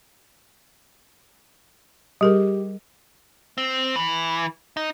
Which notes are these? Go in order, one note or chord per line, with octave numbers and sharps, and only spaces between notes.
G3 G4 G#4 A#4
C4
E3
D#4